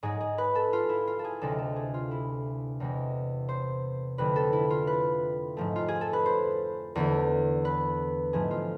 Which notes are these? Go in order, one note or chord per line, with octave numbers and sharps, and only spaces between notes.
G#2 G#3 G#4
G#4
B4
A4
F4
E4
F4
A4
G#4
D2 C3 G#3 A4
A4
G#4
F4
E4
E2 C3 G#3
C5
F2 D3 A3 B4
A4
E4
F4
B4
G#2 F3 A3
F4
G#4
A4
B4
C5
E2 D3 A3
B4
G#2 F3 A3 G#4
F4